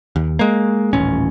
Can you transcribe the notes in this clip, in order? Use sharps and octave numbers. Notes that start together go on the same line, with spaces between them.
D#2
G#3 A#3
D#1 A1 C#4